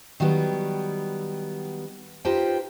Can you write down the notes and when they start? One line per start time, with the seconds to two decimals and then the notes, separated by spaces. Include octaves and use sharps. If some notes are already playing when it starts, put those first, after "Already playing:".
0.20 D#3 F#3 G3 B3
2.25 D#4 F4 G4 B4 C5 G5